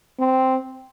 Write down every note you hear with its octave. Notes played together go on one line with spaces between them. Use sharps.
C4